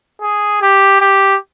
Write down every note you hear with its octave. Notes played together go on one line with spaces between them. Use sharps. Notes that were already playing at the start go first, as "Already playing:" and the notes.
G#4
G4
G4